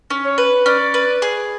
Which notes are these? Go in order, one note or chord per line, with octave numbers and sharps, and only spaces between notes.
C#4
C#5
B4
C#4 D5
B4
G#4